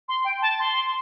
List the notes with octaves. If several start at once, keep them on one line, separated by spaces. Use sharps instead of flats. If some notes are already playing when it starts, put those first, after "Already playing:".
C6
G5
A5
C6